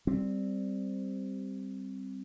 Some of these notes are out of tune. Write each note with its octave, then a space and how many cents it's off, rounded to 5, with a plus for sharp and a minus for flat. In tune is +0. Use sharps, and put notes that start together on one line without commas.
G3 +0 C4 +0